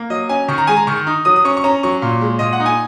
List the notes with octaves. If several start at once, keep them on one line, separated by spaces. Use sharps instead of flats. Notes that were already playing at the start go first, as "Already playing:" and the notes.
Already playing: A#3
F#3 D#5
C#4 G#5
D#3 C#6
A#5
G#3 G#5
A#5
D#3 C#6
D#4
F#3 D#6
D#6
C#4 C#6
C#6
C#4 A#5
F#3 C#6
A#2
G#3
A#2 D#5
F#5
D#4
G#5